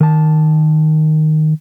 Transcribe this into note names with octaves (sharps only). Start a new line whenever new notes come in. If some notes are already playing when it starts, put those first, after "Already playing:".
D#3 A5